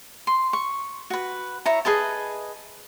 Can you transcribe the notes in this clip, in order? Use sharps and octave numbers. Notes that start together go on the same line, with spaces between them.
C6
C#6
F#4 B4
E4 C#5 A#5
G#4 B4 D#5 A5